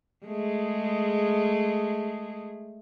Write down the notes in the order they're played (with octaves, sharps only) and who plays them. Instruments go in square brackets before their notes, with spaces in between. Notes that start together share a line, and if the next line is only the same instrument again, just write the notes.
[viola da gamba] G#3 A3 G#4